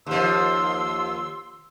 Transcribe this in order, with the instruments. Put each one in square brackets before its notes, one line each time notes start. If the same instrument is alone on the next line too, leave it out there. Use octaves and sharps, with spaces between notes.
[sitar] D#2 F3 [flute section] C6 E6